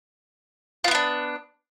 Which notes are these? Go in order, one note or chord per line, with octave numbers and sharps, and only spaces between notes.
B3 D4 E4 F4